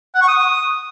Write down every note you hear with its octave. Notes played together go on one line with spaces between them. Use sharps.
F#5
C#6
D#6